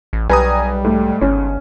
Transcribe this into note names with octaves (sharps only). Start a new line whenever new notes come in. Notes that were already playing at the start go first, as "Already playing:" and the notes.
A1
B1 G3 B4 G#5 A#5 D#6
G#2 A3
G1 C#4